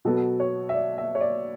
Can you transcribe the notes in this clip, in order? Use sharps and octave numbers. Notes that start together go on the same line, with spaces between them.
B2 F#3 B3 A4
C#5
E5
D5
E5
C#5
D5